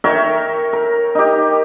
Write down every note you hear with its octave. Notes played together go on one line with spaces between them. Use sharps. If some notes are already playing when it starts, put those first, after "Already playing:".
A#4 C#5 E5 G5
A#4
D#4 G4